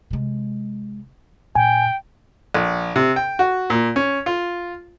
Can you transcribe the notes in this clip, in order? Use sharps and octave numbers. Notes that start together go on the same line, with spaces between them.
C3 G#3
A#2 G5 G#5
A#1
C3
G5
F#4
A#2
C#4
F4